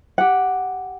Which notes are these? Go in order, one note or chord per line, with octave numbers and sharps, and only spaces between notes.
G4 F#5